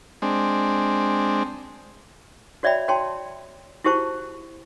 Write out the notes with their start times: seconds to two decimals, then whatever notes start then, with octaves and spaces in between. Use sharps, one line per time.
0.22 G#3 C4 D4
2.63 F#4 C#5 D5 E5 G5 B5
2.88 F#4 C#5 G5 A5 C6
3.84 E4 F#4 G4 C5 A5 C#6